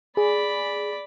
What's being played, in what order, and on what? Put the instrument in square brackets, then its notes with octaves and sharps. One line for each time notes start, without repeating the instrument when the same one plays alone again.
[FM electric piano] G#4 [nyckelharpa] D5 B5